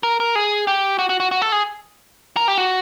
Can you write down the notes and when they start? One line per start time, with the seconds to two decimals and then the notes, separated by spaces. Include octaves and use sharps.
0.03 A#4
0.20 A#4
0.35 G#4
0.67 G4
0.99 F#4
1.09 F#4
1.20 F#4
1.31 F#4
1.42 A4
1.52 G#4
2.37 A#4
2.48 G4
2.58 F#4